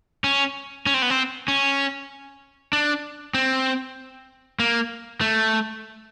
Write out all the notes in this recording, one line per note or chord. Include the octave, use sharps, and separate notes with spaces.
C#4
C#4
C4
B3
C4
C#4
D4
C4
A#3
A3